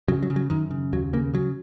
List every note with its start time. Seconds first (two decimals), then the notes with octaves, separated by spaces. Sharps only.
0.08 C#3 F#3
0.23 F#3
0.30 C#3
0.36 F#3
0.50 F#2 D#3
0.71 C#3
0.93 D#2 F#3
1.13 C#3 A#3
1.34 C#3 F#3